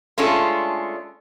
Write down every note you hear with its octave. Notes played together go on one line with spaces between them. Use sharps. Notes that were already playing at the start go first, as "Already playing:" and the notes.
G#3 A3 C#4 D4 F4 A4